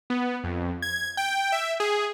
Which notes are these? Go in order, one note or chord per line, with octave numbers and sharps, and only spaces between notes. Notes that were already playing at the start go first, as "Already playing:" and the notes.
B3
F2
G#6
G5
E5
G#4